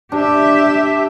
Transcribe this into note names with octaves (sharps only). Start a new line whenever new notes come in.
D4 G4 E5